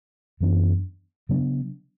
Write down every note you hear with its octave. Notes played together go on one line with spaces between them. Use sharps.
F#2 E3 B3 D4
C#3 F#3 B3 D4